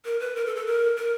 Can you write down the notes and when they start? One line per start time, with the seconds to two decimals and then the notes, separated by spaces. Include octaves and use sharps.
0.05 A#4
0.20 B4
0.36 A#4
0.46 A4
0.56 A4
0.66 A#4
0.97 A#4